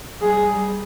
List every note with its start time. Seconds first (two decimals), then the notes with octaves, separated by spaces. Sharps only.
0.21 G3 G#4